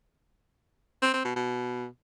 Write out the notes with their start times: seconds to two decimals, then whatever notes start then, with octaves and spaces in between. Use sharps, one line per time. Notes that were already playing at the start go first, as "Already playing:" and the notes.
1.02 C4
1.14 C4
1.25 B2
1.36 B2